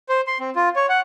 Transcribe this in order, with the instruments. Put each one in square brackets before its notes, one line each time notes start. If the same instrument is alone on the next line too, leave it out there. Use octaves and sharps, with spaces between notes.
[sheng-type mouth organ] C5
C6
C4
F4
C#5
F#5